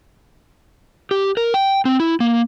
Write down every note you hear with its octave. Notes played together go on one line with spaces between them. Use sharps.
G4
A#4
G5
C4
E4
A#3